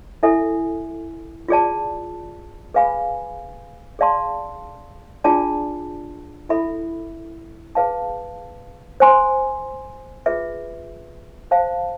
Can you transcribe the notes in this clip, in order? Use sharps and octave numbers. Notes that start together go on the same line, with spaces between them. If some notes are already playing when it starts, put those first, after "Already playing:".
E4 A4 E5 G#5
F4 G#4 D5 A5
G#4 B4 F5 G#5 B5
G#4 D5 F5 A5 C6
D4 F4 G#4 D5 A5
E4 A4 E5 B5
G#4 B4 F5 A5
C5 G#5 C6
F4 G#4 B4 E5
C5 F5 A5